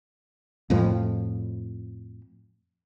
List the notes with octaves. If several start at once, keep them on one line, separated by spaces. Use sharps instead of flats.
F2 A2 F3